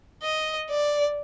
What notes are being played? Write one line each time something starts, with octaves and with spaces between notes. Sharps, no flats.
D#5
D5